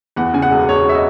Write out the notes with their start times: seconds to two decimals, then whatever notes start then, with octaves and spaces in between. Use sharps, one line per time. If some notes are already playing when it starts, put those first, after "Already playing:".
0.16 E2 F#5
0.34 C#3 G#5
0.42 F#5
0.51 E1
0.69 E1 C#5
0.89 E5
0.94 D#5